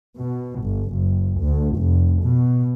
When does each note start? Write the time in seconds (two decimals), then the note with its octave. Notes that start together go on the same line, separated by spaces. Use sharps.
0.20 B2
0.63 G1
0.93 F#1
1.42 D2
1.79 F1
2.25 B2